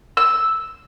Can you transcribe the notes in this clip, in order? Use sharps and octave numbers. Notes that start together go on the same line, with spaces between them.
E6